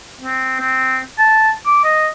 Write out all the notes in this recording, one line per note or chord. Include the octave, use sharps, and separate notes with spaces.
C4
C4
A5
D6
D#5